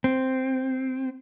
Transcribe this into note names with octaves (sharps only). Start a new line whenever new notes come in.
C4